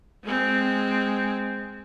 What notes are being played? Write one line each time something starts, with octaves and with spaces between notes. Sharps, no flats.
G#3 C4